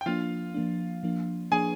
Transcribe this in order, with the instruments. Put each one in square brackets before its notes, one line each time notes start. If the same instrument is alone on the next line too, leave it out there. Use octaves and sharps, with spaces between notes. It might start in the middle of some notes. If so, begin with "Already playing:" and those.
[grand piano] G5
[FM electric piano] F3 A#3 D4 [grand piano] F4 F5
[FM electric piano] F3 A#3 D4
F3 A#3 D4
[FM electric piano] F3 A#3 D4 [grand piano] G#4 G#5